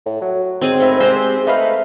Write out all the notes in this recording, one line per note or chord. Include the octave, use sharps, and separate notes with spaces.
A2
F#3
G#2 C4 G#4
A3 E4 A#4
G#3 C4 G4 C5
A3 D#4 B4 F5